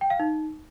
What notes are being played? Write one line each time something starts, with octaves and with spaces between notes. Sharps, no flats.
G5
F5
D#4